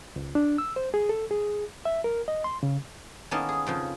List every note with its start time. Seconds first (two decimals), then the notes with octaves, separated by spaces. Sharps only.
0.16 C#2
0.35 D4
0.58 E6
0.76 C5
0.94 G#4
1.09 A4
1.31 G#4
1.85 E5
2.04 A#4
2.28 D#5
2.44 C6
2.63 C#3
3.31 D#3 A#3 B3 C#4 E4 A4
3.49 G#4
3.67 F2 C#3 F3